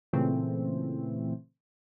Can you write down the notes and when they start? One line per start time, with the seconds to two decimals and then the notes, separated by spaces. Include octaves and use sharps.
0.13 A#2 C#3 E3 A3 C4